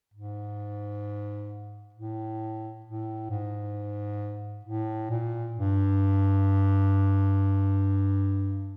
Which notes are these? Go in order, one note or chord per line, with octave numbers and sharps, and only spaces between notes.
G#2
A2
A2
G#2
A2
A#2
G2